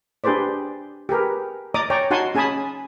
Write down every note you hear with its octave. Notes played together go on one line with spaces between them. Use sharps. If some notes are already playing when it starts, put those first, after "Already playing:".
D4 G4 G#4 B4 C5 D5
G4 G#4 A#4 B4
D5 D#5 A#5 D6 D#6
C#5 D5 G5 G#5 A#5
D#4 F#4 F#5 G#5 A5 C6
C#4 G#4 G#5 A5 B5 D#6